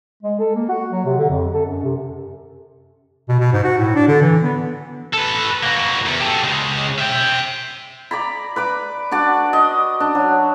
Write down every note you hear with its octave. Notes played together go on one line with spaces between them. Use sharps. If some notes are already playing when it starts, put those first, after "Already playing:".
G#3
A4
A#3
F#4
F#3
C3
D3
F2
A4
F#2
C3
B2
B2
G#2
F#4
A2
D4
D3
E3
B3
A4 B4
A#3 F#4
E2
G4 A4
C#3 G#3
E5 G5
D5 A#5 B5
B4 B5 D6
D4 F#4 D5
D#5
D4
F#3